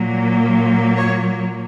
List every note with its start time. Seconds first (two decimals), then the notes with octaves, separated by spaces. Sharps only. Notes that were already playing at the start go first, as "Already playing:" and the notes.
Already playing: A#2 F#3 A#3
0.97 C#5